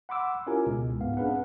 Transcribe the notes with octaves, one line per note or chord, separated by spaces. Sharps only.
F#5 B5 C6 D6 E6
C#4 E4 F4 G4 A#4 G#5
C#2 B2 G#3
B1 G#2 B3 F5
C4 D4 G#4 B4 F5 F#5